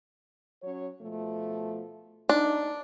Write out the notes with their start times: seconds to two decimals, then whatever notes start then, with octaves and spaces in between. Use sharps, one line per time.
0.63 F#3 C#4 C#5
1.01 B2 F3 A3
2.29 D4 D#4